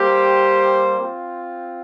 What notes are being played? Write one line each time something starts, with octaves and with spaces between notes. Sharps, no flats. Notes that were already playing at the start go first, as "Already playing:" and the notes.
Already playing: G3 A#3 G4 C5
C4 F4